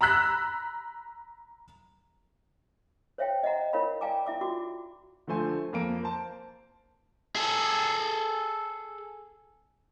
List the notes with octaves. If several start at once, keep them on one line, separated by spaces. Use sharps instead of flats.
A#5 B5 E6 F#6 B6
C5 C#5 E5 F5 G5
D#5 E5 F#5 A#5
E4 A#4 C#5 F5 B5
D5 F5 G5 G#5 A#5 D6
E4 E5 D6
F4 F#4 D6
D3 F3 A3 C5 G#5
F2 A#3 D7
C5 A5
G#4 A4